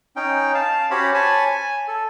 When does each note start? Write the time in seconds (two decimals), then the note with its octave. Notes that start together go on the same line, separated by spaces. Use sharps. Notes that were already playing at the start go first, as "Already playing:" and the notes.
0.16 C#4 D#4 G5
0.55 F5 A5
0.91 C#4 F#4 G4 C5 C#5 B5
1.14 C#5 G#5 A5 B5
1.46 G#5
1.88 A4